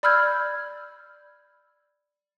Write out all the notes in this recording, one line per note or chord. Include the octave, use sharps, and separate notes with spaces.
D5 B5 E6 F6 G6 G#6